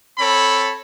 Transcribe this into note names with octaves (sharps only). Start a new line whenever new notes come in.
C4 A4 C#5 B5